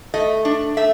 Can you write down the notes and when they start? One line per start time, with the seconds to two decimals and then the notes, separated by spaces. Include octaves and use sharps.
0.14 A3 D#5
0.45 D4
0.77 A3 E5